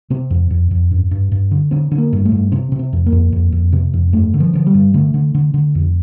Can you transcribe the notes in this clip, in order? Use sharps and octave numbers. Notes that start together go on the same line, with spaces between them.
C3 C4
F2
F2
F2
G2
G2
G2
D3
D3 C4
D3
A#3
G2
A3
G2
C3 C4
C3
C4
F2
A#3
F2
F2
F2
C3
F2
G2 A3
D3
F3
D3 F3
G3
G2
D3 A3
D3
D3
D3
F2